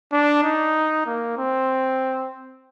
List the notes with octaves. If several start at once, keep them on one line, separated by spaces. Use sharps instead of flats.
D4
D#4
A#3
C4